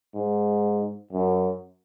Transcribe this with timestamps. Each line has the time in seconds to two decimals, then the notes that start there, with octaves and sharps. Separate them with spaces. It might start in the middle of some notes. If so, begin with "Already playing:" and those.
0.15 G#2
1.13 F#2